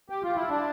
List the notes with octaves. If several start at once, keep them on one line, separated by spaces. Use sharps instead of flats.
G4
F4
E4
D4